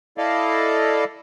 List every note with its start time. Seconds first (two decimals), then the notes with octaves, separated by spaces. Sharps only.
0.18 E4 A4 D5 D#5 F5